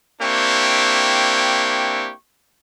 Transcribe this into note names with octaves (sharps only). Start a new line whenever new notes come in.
A#3 C4 D4 E4 G4 C#6